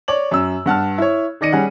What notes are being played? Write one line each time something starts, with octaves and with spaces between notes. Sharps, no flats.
C#5 D5 F#7
F#2 E6
G2 F#5 A5 F6
E4 C#5
D#3 D#4 D5 A#6 C#7 D#7
G3 C#4 G#4 F#5